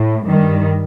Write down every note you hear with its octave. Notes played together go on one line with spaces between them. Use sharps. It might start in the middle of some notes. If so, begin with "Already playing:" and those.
Already playing: A2
G2 D#3 G3